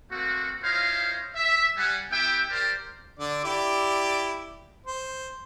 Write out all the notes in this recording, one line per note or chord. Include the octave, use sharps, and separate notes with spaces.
A3 A#3 C4 F#4
E4 F4 C5 C#5 D#5 F5
E5
G3 F#5 G#5
B3 E4 G4 E5 G5
G4 A#4 C5 D5
D3 D5
E4 G4 D5
C5